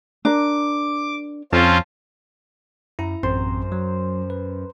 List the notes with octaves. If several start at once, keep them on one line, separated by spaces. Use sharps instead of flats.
D4 A#4 D6
F2 C4 C#4 F4 A5
F#2 E4 A#5
A1 F#2 C4 C5 C6
F#3
B4